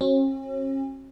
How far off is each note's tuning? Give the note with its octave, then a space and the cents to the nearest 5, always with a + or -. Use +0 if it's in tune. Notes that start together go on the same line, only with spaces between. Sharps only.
C#4 -45 F#4 +0